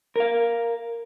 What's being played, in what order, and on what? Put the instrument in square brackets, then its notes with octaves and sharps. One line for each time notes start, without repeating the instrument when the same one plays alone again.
[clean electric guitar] A#4 F5